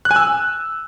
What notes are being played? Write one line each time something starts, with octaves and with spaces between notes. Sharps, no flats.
F#6
G#5
E6